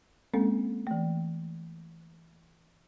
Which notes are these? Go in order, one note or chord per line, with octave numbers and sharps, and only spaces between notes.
G#3 A#3 C4 C#4 A4
E3 A3